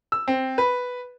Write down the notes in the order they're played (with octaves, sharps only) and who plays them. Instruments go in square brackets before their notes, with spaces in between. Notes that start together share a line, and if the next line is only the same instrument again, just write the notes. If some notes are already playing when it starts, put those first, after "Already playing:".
[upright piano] E6
C4
B4